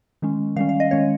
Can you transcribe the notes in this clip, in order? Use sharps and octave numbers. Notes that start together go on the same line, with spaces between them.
D#3 G#3 C#4
D#3 G3 C#4 F5
F5
D#5
D#3 G#3 C#4 C#5